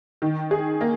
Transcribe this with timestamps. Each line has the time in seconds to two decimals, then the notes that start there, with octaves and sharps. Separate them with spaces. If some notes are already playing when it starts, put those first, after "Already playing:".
0.22 D#3
0.51 G#4
0.81 A#3